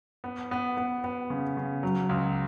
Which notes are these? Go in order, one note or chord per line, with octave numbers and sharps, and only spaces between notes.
B3
B3
B3
B3
C#3
C#3
F#3
C#2